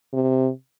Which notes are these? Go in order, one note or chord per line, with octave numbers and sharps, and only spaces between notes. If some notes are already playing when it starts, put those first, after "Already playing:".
C3